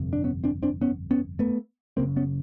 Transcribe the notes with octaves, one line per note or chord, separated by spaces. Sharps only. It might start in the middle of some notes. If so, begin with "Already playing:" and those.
Already playing: G1 F2 C3
D4
B3 C#4
C4 D4
C4 D4
B3 C#4
B3 C#4
A3 B3
F#1 E2 C#3 A#3 C4
B3 C#4